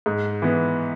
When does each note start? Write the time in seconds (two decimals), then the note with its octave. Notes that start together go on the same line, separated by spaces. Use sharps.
0.06 G#2
0.42 E3 B3